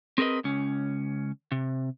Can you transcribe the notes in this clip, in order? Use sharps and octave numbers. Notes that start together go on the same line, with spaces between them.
C4 G#4 A#4 B4 D#5
C#2 C#4
C3